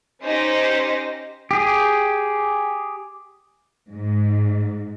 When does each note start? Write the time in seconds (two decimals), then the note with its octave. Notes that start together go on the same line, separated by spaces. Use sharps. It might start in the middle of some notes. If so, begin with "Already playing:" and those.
0.23 C#4 D#4 G4 C5 A#6
1.51 G4 G#4
3.89 G#2